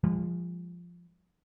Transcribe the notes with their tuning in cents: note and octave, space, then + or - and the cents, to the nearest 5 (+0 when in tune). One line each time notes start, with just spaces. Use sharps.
F3 -5 G#3 -40